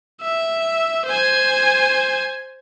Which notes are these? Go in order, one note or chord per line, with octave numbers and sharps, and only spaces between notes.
E5
C5 G#5